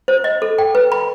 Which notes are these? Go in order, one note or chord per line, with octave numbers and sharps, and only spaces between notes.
C5
D#5
A4
G5
B4
B5